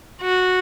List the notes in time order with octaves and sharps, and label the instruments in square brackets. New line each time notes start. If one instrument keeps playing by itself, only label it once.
[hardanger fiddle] F#4